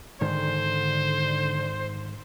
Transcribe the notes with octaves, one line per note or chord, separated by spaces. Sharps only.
G#2 D3 D#3 C5